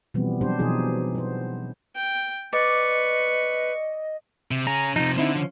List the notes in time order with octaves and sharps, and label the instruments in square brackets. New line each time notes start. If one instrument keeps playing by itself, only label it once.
[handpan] B2 E3 F3 G3 B3 C4
F#3 G3 C4 D4 G4 C5
B2 E3 F3 D#4 G#4
B3 C5
[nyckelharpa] G5
[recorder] B4 [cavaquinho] D5 [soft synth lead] D#5 [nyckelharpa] C#6
[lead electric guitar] C3
[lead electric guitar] C#4 G#4 [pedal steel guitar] A#5
[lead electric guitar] C3 F3 [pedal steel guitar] D#4
[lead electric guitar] D3 [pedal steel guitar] C4 D#4 E4
[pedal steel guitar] F3 C#4